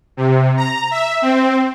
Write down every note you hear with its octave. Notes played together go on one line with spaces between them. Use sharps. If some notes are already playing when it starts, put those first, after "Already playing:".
C3
A#5
E5
C4